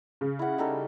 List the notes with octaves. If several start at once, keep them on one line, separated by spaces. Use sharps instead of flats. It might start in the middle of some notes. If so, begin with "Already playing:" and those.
C#3
E4 F#5
G3 D#4 A4